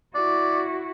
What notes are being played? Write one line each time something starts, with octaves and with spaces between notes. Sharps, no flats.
E4 F#4 D5